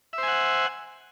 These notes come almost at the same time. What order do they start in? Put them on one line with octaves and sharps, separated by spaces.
E5 C5 G#5 F#5